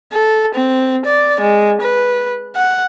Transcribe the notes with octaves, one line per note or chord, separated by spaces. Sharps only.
A4
C4
D5
G#3
B4
F#5